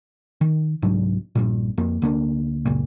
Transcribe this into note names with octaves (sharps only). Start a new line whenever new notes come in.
D#3
C2 G#2 F#3 D4
A#1 G2 A#2
F2 A#3
D2 A#3 D4
F#1 C#2 A#2